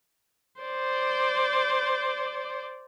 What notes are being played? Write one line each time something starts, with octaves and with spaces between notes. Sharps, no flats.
C5 D5